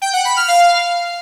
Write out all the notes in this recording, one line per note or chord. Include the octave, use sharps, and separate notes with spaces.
G5
F#5
B5
F6
F5